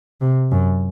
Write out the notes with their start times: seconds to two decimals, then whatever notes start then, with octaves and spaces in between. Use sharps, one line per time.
0.21 C3
0.51 F#2